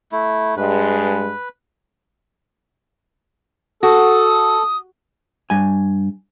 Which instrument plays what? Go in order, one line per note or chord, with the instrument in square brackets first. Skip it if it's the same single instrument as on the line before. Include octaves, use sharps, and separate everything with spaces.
[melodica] A3 E4
[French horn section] G2 G#3 [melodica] B4
[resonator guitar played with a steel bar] F#4 [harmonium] A4 [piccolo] D#6
[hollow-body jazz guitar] G2 G#5